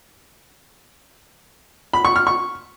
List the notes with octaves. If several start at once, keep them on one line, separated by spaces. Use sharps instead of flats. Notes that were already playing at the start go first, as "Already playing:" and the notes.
B5
C#6
F6
C#6